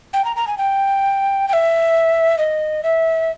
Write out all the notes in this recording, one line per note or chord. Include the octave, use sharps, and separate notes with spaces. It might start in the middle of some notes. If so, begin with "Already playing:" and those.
G5
A#5
A#5
G#5
G5
G5
E5
D#5
E5